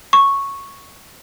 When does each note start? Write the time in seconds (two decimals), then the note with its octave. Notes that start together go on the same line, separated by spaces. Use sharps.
0.13 C#6